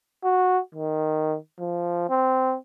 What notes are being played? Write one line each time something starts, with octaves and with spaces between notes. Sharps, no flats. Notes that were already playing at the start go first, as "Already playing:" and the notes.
F#4
D#3
F3
C4